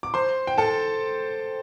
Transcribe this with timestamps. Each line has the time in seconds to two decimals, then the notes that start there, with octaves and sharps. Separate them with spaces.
0.03 D6
0.14 C5 C6
0.47 G5
0.58 A4 A5